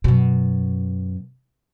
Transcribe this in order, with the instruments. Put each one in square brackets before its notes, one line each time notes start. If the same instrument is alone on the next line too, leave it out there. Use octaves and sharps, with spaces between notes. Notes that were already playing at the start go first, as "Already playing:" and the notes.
[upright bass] F#2 B2